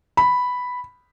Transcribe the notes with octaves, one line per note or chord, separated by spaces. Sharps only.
B5